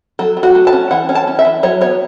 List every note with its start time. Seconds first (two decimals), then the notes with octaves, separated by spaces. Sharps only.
0.19 F#3 A4
0.37 F#3
0.43 F#4
0.55 A3
0.67 A5
0.73 C#4
0.91 E3 F#5
1.09 C#4
1.15 A5
1.27 C#4
1.39 E5
1.45 E3
1.63 F#3 C#5
1.81 B3 C#5